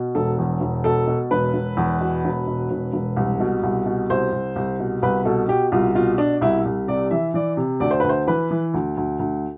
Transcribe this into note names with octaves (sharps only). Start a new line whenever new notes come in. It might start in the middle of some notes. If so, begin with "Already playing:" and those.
Already playing: B2
E1 A4
E2
E1
B2 A4
B2
E1 B4
E1
E2
B2
E1
B2
E1
E1
C2
B2
C2
B2
C2 C5
C2
C2
B2
C2 B4
B2 A4
B2 G4
C2 F4
B2 F4
B2 D4
C2 E4
C2
C3 D5
E3 E5
E3 D5
C3
D2 D5
C5
D2 B4
C5
E3 B4
E3
D2
D2
D2